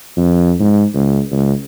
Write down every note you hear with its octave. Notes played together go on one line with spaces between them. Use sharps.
F2
G#2
C#2
C#2